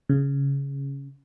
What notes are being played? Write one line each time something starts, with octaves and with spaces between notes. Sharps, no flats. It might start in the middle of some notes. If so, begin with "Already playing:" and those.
C#3